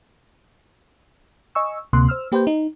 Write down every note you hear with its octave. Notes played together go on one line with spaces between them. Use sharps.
D#5 G#5 C#6 E6
D2 C3 A#3 C6 F#6
C5 E6 F6
A#3 G4 B4 C5 G5 G6
D#4